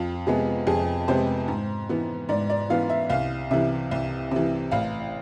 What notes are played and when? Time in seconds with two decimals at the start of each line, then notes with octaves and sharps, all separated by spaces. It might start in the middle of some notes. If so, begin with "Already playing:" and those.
Already playing: F2 F4
0.27 C3 G#3 B3 G#4
0.67 F2 G#4
1.08 C3 G#3 B3 C5
1.48 G#2
1.89 E3 B3
2.29 G#2 D5
2.50 D5
2.70 E3 B3 F5
2.90 E5
3.10 C2 F5
3.51 C3 E3 E5
3.91 C2
4.31 C3 E3
4.71 A1 F5